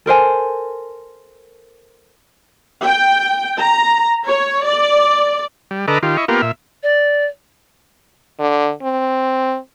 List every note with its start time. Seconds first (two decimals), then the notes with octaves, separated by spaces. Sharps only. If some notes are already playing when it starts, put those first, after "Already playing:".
0.06 A4 A#4 C5 G#5
2.84 G5
3.58 A#5
4.28 C#5
4.66 D5
5.71 G3
5.88 D3 A4 B4 D#5 A#5 D6
6.03 D#3 F4 G4
6.17 E4 D#5 C#6
6.28 A#3 B3 F4 G4 A#4
6.42 A#2 E5
6.83 D5
8.40 D3
8.83 C4